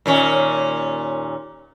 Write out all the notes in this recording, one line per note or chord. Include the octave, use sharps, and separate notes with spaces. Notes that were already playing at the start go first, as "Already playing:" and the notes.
D#2 A#2 C#4